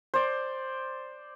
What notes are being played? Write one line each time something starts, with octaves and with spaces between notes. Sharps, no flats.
C5 D5